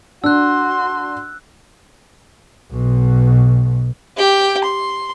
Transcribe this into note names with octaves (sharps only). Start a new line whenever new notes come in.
D4 F#4 C6 E6 F#6
B1 B2
G4 G5
C6